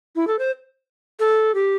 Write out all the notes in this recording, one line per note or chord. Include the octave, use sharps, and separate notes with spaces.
E4
A4
C5
A4
G4